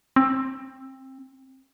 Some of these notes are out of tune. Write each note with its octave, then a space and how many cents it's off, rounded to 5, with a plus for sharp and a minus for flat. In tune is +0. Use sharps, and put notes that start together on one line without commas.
C4 +20